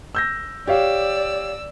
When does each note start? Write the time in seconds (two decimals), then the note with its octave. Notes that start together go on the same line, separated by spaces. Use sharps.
0.15 E6 G6 A#6
0.67 G4 C#5 D5 F5 E6